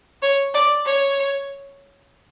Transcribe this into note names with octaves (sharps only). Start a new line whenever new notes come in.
C#5
D5
C#5